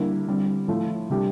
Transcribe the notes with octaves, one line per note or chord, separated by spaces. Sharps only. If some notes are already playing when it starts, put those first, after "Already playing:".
Already playing: D3 G3 A#3 E4
D3 G3 C4
A2 F3 A3
C3 G3 D4 G4